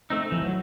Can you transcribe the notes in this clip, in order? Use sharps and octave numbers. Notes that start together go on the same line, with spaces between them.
A3 C4 D#4
E3 F3
F#3